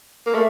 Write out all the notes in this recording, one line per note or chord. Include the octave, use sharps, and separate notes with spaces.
A#3
A3